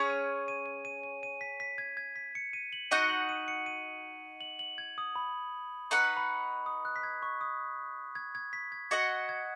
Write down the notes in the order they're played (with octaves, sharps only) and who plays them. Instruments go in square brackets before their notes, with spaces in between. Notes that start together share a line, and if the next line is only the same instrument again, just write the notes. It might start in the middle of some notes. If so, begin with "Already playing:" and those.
Already playing: [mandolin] C#4 G#4 C#5
[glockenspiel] D#7
D#7
D#7
D#7
D#7
D#7
B6
B6
G#6
G#6
B6
C#7
D#7
F#7
[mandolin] D#4 F#4 D#5 F#5 [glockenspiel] D#7
[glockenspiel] F#7
D#7
C#7
D#7
F#7
F#7
G#6
D#6
B5
[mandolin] D#4 B4 F#5 [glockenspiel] C#6
[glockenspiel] B5
D#6
F#6
B6
G#6
C#6
D#6
G#6
G#6
B6
G#6
[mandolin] F#4 D#5 F#5 [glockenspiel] G#6
[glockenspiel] G#6